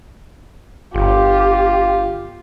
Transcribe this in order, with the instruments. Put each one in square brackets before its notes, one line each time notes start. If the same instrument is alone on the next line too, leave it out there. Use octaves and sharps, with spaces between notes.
[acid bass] G1 [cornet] F4 [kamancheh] G4